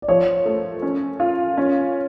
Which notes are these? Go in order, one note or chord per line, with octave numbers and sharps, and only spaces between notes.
D5
F3 C#5
A3
C#4
F4
C#4